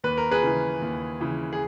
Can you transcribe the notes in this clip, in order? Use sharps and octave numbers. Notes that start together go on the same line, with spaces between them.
D#2 B4
A#4
G#4 B4
C#3 E3
D#2
C#3 E3
G#4